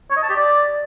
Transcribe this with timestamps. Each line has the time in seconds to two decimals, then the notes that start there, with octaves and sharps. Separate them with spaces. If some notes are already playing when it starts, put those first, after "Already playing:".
0.10 C#5
0.16 D#5
0.23 A5
0.29 G4
0.35 D5